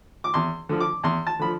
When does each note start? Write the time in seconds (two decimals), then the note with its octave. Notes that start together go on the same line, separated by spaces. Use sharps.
0.24 D6
0.34 E2 C6
0.69 D3 F3
0.80 D6
1.04 E2 C6
1.27 A5
1.39 D3 F3 B5